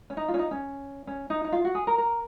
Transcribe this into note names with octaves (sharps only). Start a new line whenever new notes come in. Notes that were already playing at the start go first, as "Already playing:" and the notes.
C#4
D#4
F4
C#4
D#4
C#4
C#4
D#4
D#4
F4
F#4
G#4
A#4
A#4